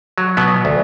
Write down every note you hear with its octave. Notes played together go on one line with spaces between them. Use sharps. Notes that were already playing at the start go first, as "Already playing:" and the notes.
F#3
B2 F#3 B3
D2